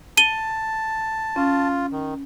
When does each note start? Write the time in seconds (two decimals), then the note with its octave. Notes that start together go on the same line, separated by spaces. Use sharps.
0.17 A5 D#7 G7
1.36 C#4 F4
1.92 D#3